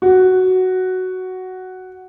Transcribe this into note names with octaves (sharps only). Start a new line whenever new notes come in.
F#4